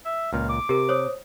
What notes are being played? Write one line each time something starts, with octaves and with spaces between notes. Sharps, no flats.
E5
C#2 A#2 F5
D6
C3 G4 A#4
C5 C#5 D#6